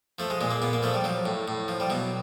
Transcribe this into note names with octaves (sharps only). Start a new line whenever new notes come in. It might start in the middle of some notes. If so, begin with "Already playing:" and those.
F3 A3
G#3
A#2 G#3
A#3
A#2 B3
A#3
F3 A3
G3
F3 F#3
A2
A2
F3
G3
B2 F#3